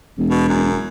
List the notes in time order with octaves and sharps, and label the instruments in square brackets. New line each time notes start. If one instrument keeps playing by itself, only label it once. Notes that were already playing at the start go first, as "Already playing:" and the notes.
[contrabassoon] E1
[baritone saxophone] B2
F#2